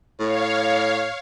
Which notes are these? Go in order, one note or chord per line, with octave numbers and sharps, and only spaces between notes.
A2 C#5 F5